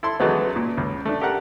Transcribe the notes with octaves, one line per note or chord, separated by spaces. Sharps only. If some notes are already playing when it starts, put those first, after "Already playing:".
E4 A4 C6
E3 F#3 G#3 A3 B3
A#2
C#2
A3 D4
G4 A4 A#4 F#5